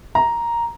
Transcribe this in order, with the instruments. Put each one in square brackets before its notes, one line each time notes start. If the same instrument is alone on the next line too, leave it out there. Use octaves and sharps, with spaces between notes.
[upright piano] A#5